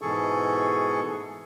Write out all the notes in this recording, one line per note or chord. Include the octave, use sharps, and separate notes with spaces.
G#2 B2 E3 G#4 A4 C#6